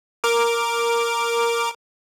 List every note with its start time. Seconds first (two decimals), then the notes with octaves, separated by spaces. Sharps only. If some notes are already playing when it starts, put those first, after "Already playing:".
0.24 A#4 D6